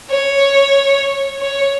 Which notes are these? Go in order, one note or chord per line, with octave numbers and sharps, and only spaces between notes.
C#5
C#5